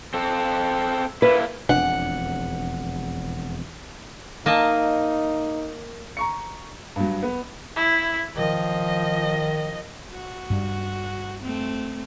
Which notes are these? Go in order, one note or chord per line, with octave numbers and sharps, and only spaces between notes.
C4 A4
A#3 E4 B4
E1 F2 D4 F#5
A#3 D#4 D#5 A5
A#5 C#6 C#7
G2 F#3
B3
E4
D#3 F3 D#5
F#4
G2 G3
A3 C4